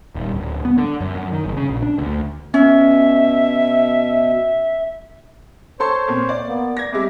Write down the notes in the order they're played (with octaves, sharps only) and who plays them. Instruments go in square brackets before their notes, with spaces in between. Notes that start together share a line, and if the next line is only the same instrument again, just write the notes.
[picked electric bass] D#1
D1
B3
D3
F#2
F#2
D#3
F#1
C#3
A#1
D4
D2
[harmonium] B2 [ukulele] C#4 [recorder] E5
[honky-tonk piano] A4 A5 C6 [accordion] C5 C#5
[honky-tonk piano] A#2 C4
D5
[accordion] A#3 B3
[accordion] D5 [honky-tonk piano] G#6 A#6
[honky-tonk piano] G3 G#3 C4 [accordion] E5 D6